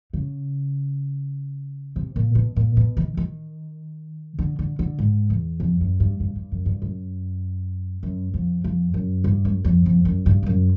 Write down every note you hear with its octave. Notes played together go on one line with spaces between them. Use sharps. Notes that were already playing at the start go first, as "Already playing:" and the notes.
C#3
C3
A#2
B2
A#2
B2
D#3
D#3
D3
D3
D3
G#2
E2
F2
F#2
G2
G2
G2
F#2
G2
F#2
F#2
F2
F2
F#2
G2
F#2
F2
F2
F#2
G2
F2
F#2